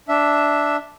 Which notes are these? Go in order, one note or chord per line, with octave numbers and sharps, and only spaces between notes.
D4 E5